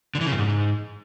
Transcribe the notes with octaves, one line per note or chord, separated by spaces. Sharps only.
D3
E3
C#3
G2
G#2